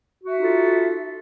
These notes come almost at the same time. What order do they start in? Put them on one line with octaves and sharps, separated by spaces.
F#4 E5 D#4 F4 A4